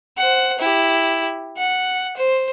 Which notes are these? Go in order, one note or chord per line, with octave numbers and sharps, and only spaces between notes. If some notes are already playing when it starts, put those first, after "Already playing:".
C5 F#5
E4 G4
F#5
C5